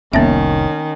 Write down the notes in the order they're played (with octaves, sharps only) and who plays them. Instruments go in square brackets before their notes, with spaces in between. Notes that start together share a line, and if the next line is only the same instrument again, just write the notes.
[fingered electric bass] F1 C2 [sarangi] D#3 [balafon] A#3 B3 E5 [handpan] C#4